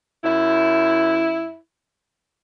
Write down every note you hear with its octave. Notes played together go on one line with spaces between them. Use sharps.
F#2 E4